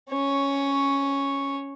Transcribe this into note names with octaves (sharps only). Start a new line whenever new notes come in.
C#4 C#5